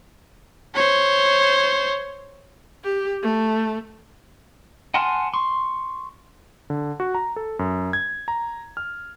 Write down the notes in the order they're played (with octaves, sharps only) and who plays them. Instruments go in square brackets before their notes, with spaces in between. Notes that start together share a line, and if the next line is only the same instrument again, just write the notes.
[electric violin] C5 C#5
[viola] G4
A3
[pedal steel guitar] F#5 G#5 A5 C6 F6
C6 C#6
[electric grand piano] D3
F#4
A#5
A4
F#2
G#6
A#5
F6